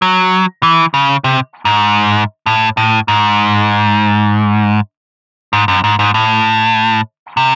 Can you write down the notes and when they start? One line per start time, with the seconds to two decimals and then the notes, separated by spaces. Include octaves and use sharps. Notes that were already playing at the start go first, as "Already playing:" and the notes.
0.02 F#3
0.63 E3
0.94 C#3
1.24 C3
1.65 G#2
2.46 A2
2.77 A2
3.08 G#2
5.53 G#2
5.68 F#2
5.84 G#2
5.99 G#2
6.14 A2
7.37 C3